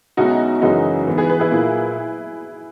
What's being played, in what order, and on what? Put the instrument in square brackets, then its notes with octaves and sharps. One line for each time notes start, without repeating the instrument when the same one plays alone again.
[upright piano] B1 B2 G#3 C#4 E4 [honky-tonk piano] D#4 F#4
[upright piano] F#2 C#3 E3 G#3 C#4 [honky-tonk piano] D#4 F#4
[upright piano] G#2 E3 B3
[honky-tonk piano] G#4 B4
G#4 B4
E4 G#4
[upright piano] A#2 A#3 E4 G#4